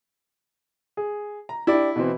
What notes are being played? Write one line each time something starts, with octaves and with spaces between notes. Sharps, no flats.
G#4
A#5
D4 E4 G4 D5
B2 E3 C4